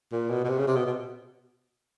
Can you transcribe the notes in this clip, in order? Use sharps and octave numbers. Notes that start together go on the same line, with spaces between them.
A#2
B2
B2
C3
C#3
C3
B2
B2